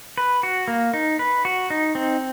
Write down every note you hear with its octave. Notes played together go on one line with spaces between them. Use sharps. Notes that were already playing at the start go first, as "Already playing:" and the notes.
B4
F#4
A#3
D#4
B4
F#4
D#4
C4